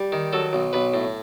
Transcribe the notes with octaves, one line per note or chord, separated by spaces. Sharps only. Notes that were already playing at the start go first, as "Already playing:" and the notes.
Already playing: G3
D#3
F#3 A4
B1
B1 B4
A2